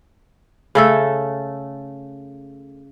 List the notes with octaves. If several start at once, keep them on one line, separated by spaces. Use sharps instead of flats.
C#3 A3 A4